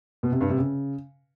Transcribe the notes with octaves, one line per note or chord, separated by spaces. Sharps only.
B2
C3
G2
C3
C#3